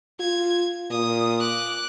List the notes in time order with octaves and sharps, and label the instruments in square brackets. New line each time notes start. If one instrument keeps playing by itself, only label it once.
[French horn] F4 [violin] G#6
[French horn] A#2 [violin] D#6
[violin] D6 F#6